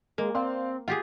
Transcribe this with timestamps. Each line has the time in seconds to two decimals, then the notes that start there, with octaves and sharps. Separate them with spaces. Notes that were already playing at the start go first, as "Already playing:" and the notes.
0.18 G#3 A#3
0.35 C4 D5 F5 C6
0.88 F4 G4 G#4 F#5